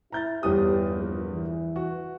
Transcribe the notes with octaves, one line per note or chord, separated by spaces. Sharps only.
E4 A#5 G6 A6
G1 E2 G4 D#6
A#1
E3
F#4